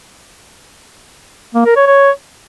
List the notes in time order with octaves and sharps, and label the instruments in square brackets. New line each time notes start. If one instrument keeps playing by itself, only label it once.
[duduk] A#3
A#4
C#5
C#5